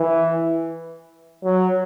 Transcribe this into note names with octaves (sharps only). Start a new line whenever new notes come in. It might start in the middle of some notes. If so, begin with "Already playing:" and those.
Already playing: E3
F#3